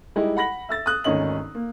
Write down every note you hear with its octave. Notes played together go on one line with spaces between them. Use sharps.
G3 G#3 D#4 E4 G4
F#5 B5 A#6 F#7
E5 E6 A6
D#6 F#6
G#1 D2 D#3 C#4 D#5 F#7
A#3